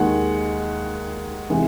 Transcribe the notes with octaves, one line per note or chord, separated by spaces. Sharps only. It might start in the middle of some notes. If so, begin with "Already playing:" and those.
Already playing: D#2 D#3 G#3 F#5
C3 E3 G#3